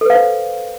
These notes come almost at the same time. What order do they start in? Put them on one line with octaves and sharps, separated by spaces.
A4 B4 F5 C5